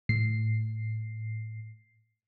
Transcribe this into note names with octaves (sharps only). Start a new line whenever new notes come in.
A2 C7